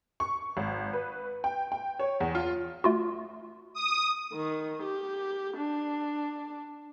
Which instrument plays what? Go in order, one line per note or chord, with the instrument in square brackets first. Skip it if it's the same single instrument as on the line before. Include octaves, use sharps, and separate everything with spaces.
[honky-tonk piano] C#6
G#1
B4
G5
G5
C#5
E2
F4
[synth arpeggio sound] A3 F4 F#4
[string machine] D#6
[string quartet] D#3
G4
D4